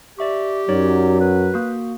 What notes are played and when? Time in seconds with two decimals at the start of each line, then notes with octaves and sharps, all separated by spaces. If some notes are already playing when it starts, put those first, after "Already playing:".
0.19 G4 D5 E5 C#6
0.69 F#2 F#3 D#4 C#5 D5
1.21 B4
1.54 A#3 F#4